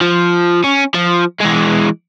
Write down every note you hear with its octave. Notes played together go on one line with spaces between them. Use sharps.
F3
C#4
F3
E3 G#3